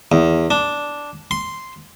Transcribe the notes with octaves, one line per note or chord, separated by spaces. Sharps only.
E2
D4
C6